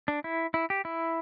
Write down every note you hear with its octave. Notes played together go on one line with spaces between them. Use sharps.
D4
E4
E4
G4
E4